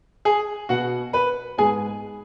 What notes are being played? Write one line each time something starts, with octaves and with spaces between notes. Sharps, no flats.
G#4 G#5
B2 B3 F#4 F#5
B4 B5
G#2 G#3 B3 G#4 G#5